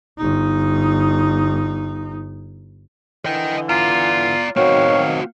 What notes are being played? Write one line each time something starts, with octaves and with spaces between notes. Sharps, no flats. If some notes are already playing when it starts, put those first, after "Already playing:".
G1 D#4
D3 E3 D#5 G5
F4 D5 A#5
B2 D#3 F#3 C4 F#4 C#5 F5